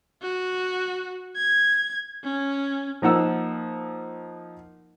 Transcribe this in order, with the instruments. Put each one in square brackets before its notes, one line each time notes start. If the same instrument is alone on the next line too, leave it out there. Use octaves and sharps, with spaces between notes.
[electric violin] F#4
G#6
C#4
[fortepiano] F3 A#3 D#4 F#5 E6